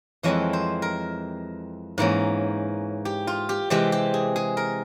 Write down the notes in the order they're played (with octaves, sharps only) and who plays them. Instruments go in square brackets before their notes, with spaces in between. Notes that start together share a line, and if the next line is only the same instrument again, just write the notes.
[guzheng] F2 E3 G#3 C4 C#5
C5
A#4
G#2 E3 A#3 C#4
G4
F4
G4
C3 E3 G#3 C4 G4
G4
G#4
G#4
A#4